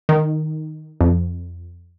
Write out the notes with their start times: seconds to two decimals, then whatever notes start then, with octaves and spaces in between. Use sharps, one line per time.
0.09 D#3
1.01 F2